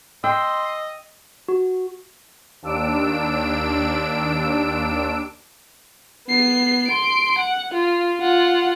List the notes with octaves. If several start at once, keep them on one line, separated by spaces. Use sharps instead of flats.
D#5 G5 C6 E6
F#4
D#2 D4 E6 D7
B3 C7
C6 D7
F#5
F4
F4 F#5